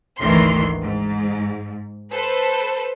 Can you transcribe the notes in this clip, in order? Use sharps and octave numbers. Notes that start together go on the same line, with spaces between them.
G#1 D2 D#3 E3 C6
G#2
A4 B4 C5